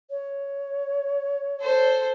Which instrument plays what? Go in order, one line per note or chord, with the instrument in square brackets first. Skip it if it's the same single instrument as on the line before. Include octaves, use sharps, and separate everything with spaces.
[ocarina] C#5
[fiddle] A4 C5